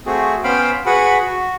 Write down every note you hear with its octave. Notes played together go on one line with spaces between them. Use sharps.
A3 C4 F#4 G#4
B3 C#4 C5 F5 G5 B5
F#4 G#4 B4 F#5 B5
F#4